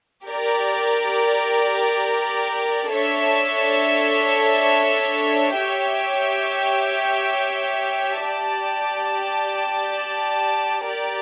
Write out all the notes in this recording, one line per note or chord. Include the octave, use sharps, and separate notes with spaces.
G4 A#4 D5
D4 A4 C#5 E5
G4 C#5 E5 G5
G4 D5 A5
G4 A#4 D5